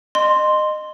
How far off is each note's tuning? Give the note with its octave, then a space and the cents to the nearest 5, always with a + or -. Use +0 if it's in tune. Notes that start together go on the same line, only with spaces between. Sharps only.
D#5 -25 C6 +0